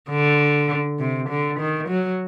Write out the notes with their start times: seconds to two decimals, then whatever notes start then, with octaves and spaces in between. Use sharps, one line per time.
0.10 D3
0.99 C3
1.29 D3
1.60 D#3
1.89 F#3